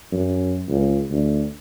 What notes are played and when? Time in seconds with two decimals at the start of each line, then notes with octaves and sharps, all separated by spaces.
0.12 F#2
0.69 C#2
1.11 D2